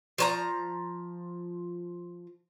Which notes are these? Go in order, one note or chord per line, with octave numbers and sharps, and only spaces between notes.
F3 C#5 A#5